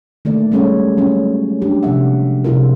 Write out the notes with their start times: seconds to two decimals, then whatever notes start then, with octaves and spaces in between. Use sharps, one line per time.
0.25 D#3 A3 A#3 D5
0.52 G3 G#3 C#4 G#4 A4 C#5
0.98 F#3 C#4
1.62 F#3 D4 G4
1.83 C3 F3 F#3 E5 F#5
2.44 C3 F3 E4 F4 G#4 A#4